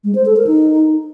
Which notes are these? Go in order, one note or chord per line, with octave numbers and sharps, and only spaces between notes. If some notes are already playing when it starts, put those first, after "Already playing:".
G#3
C5
A4
A#4
D#4